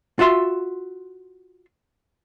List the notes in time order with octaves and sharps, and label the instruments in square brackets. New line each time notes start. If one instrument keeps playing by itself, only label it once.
[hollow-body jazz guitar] F4 F#4 E5 C6